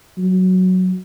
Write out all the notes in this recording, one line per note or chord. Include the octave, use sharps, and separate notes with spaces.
F#3